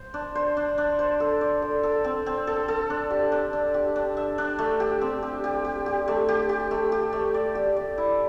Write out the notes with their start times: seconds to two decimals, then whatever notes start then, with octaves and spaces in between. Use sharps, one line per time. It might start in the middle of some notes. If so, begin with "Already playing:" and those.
Already playing: C5
0.14 D4
0.35 C5
0.57 D4
0.78 D4
0.99 C5
1.20 A4
1.41 D5
1.62 A4
1.83 A4
2.04 C4
2.26 C4
2.47 A4
2.68 A4
2.90 D4
3.10 G4
3.32 D4
3.53 D4
3.74 G4
3.96 D4
4.17 E5
4.38 D4
4.59 A3
4.80 G4
5.01 C4
5.22 G4
5.44 G4
5.65 G4
5.86 G4
6.08 A3
6.28 G4
6.49 G4
6.71 A3
6.92 G4
7.13 A3
7.34 D5
7.55 G4
7.77 D5
7.98 E4